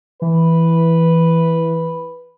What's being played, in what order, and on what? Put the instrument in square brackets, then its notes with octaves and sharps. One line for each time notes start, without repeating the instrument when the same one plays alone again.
[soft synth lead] E3 [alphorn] B4